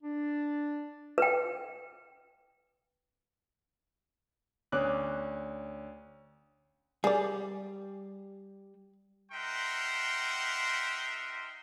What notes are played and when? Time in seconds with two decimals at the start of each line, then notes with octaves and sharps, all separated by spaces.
0.03 D4
1.18 B4 G5
4.72 D2 C#4 C#5 D6 F#6
7.04 G3 G#4 D5
9.32 D#4 A#4 E5 F#5 G5 C6